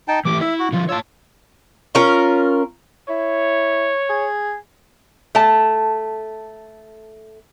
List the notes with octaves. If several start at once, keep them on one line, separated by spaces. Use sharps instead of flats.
D#4 G5 A5
E3 A3 G4 D6
E4 E5
F#4
D3 F3 F4
F4 C#5 A5 E6
C#4 F4 A#4
E4 C#5
G#4
A3 A5